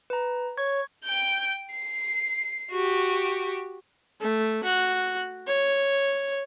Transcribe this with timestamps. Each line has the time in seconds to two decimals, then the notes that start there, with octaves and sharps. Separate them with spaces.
0.10 B4 A#5
0.57 C#5 C#6 G#6
1.04 G5 G6
1.71 C7
2.71 F#4 G4
4.21 A3
4.64 F#4
5.47 C#5